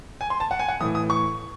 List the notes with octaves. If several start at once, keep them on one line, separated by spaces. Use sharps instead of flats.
G#5
C6
A5
F#5
G#5
F#5
A2 E3 D#6
D#6
C#6